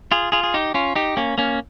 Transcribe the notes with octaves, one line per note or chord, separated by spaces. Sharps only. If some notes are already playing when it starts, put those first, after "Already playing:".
F4 G#4
F4 G#4
G#4
D#4 G4
C#4 F4
D#4 G4
A#3 C#4
A#3 C#4